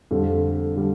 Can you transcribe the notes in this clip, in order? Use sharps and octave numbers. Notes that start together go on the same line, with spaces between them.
F2 D3 G3
D3 G3